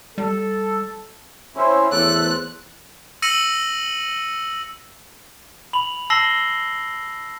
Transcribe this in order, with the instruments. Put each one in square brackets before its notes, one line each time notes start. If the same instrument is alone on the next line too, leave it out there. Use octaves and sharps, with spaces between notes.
[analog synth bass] G3 [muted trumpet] A4
[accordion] C4 C#4 E4 [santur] C5 C#5
[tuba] E2 [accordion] A3 A4 [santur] D6 [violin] F#6
[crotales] E6 A#6 C#7 D#7 F#7
[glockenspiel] B5 F7 F#7
A5 E6 A#6 C7 F#7 G7